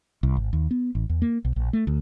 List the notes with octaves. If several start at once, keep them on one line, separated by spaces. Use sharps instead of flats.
C2
G#1
D#2
B3
A1
E2
A#3
B1
A#1
A3
D2